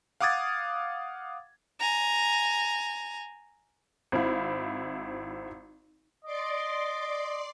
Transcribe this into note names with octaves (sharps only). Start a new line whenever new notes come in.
F5 F#5 D6 D#6 G#6 A6
G#5 A#5
G#1 C4 E4 F5 B5
D5 D#5 C6 D6